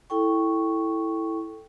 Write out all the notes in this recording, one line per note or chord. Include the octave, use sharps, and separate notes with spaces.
E4 A4 G5 C#6